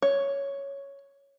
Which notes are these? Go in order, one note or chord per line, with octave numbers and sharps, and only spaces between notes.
C#5